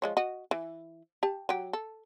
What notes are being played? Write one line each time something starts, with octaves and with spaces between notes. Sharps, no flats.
F3 G#3 C#5
F#4 D#5
E3
G4 A5
F#3 G4
A4